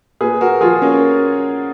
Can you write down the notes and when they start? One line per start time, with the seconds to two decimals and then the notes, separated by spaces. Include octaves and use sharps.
0.21 A#2 G#4 B4
0.41 F#4 A#4
0.61 F3 F4 G#4
0.82 A#3 C#4